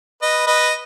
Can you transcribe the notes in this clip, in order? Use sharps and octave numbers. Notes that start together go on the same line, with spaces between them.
B4 D#5
B4 D#5